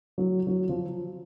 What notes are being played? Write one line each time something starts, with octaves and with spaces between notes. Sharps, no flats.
F#3
F#3
F3